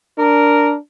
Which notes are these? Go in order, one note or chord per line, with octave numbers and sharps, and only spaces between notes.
D4 A#4